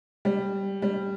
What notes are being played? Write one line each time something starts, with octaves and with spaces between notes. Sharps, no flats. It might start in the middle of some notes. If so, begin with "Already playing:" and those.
G3
G3